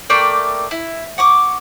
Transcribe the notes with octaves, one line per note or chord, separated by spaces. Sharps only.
A3 A#3 D5 G5
E4
F#5 C#6 D6